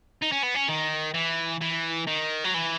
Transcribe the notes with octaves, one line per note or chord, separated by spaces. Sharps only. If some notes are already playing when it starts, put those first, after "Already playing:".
D#4
C#4
B3
C#4
D#3
E3
E3
D#3
F#3
E3